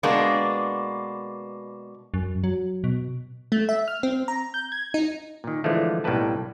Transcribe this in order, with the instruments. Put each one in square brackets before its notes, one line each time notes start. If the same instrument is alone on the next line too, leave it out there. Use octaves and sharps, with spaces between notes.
[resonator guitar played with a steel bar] B2 G#3 A#3 B3 D4
[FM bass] F#2
F#3
B2
[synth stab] A3
E5
F6
C4
A#5
G6
G#6
D#4
[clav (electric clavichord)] A#2 D#3
D3 E3 F3 G#3 A3
B1 A2 G3 A#3 B4 A5